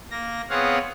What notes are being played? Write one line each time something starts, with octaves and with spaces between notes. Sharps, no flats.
A#3 A#6
B3 C4 G#4 C#5 F5 F#5